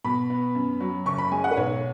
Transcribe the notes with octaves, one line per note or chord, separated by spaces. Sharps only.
B2 B5
B3
F#2
F#3
F#1 C#6
B5
G#3 G#5
F#5
B4
B1 C#5